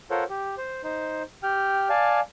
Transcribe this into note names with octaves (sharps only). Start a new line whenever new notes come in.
F4 A4 A#4 C5 C#5 F#5
G4
C5
D#4 C5
G4 G5 F6
D5 F5 G#5 A5